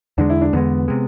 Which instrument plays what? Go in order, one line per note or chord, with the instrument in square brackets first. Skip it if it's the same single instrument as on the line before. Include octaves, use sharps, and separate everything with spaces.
[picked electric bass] E2 D3 G#3 [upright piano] D4
[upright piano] E4
D4
[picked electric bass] E2 D3 G#3 [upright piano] B3
[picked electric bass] C3 G#3